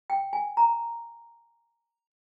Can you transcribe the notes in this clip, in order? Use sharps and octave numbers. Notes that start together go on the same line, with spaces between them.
G5
G#5
A#5